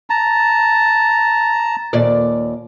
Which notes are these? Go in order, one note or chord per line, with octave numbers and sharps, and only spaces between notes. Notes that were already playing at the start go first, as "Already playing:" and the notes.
A5 A#5
D#2 A#2 D5